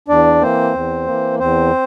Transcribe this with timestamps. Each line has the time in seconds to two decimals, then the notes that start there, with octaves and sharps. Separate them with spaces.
0.08 E2 D4 D5
0.41 E3 A#3 C4 C5
0.74 E2
1.07 E3 A#3
1.39 E2 C4 C5